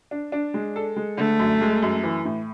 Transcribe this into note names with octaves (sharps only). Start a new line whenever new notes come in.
D4
D4
G#3
A4
G#3
D3 A3
F#2
G#3
F#2
E3
A2